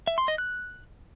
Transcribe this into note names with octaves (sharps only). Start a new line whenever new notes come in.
E5
C6
D#5
F#6